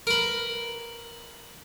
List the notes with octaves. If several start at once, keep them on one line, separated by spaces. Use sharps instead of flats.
A#4 B4